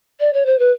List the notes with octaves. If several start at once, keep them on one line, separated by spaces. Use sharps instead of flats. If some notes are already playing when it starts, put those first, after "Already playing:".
D5
C#5
C5
B4